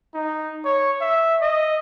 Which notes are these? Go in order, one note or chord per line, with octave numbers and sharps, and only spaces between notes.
D#4
C#5
E5
D#5